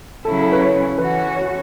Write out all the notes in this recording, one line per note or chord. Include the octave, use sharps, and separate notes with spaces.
C#3 F#3 C#4 E4 A4
A4
B4
C#5
C#5
E3 C#4 F#4 B4
C#5